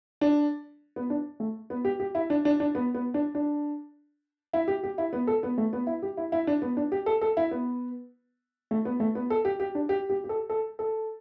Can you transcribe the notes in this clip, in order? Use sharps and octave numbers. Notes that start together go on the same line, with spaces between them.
D4
B3
D4
A3
B3
G4
G4
E4
D4
D4
D4
B3
B3
D4
D4
E4
G4
G4
E4
B3
A4
B3
A3
B3
E4
G4
E4
E4
D4
B3
D4
G4
A4
A4
E4
B3
A3
B3
A3
B3
A4
G4
G4
D4
G4
G4
G4
A4
A4
A4